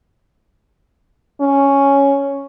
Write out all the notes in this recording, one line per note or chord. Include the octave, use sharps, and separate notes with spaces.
C#4